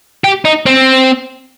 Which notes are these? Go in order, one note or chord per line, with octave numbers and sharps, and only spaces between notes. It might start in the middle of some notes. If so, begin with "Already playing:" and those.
G4
D#4
C4